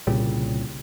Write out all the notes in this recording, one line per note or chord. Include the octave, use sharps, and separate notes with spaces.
C2 A#2 C#3 G3